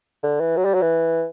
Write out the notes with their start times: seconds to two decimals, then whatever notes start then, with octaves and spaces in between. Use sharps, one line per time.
0.23 D3
0.40 E3
0.57 F#3
0.65 G3
0.74 F#3
0.82 E3